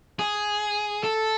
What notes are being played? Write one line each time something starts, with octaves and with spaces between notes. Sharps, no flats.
G#4
A4